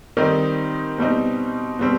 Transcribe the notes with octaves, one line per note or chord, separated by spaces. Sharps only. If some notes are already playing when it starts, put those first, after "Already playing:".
D#3 G3 C4 D#4
B2 G3 C4 D#4
B2 G3 C4